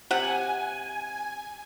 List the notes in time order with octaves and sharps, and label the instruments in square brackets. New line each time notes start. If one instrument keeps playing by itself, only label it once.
[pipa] C3 F#5 [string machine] G#5